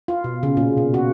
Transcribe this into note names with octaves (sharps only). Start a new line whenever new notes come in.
F4
B2
C#3
A#2
B2
F#4